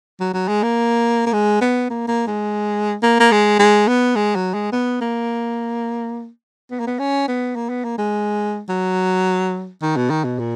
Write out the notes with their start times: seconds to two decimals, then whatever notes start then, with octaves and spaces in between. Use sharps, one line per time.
0.20 F#3
0.34 F#3
0.48 G#3
0.63 A#3
1.26 A#3
1.33 G#3
1.61 B3
1.90 A#3
2.08 A#3
2.27 G#3
3.02 A#3
3.20 A#3
3.32 G#3
3.59 G#3
3.88 B3
4.16 G#3
4.36 F#3
4.54 G#3
4.72 B3
5.01 A#3
6.71 B3
6.80 A#3
6.87 B3
6.99 C#4
7.28 B3
7.56 A#3
7.69 B3
7.84 A#3
7.98 G#3
8.69 F#3
9.82 D#3
9.96 B2
10.10 D#3
10.24 B2
10.39 A#2